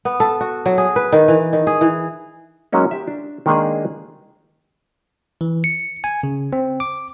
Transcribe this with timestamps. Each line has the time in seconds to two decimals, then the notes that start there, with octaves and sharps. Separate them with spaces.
0.05 B3
0.20 A4
0.41 F#4
0.66 F#3
0.78 G#4
0.96 B4
1.12 D#3
1.28 E3
1.53 D#3
1.67 G#4
1.81 E3
2.72 F#3 G#3 A#3 C#4 D#4
2.91 G4 E5
3.08 D4
3.46 D#3 G#3 A#3 D4 D#4 G#4
5.41 E3
5.64 C#7
6.04 G#5
6.23 C#3
6.53 C4
6.80 D6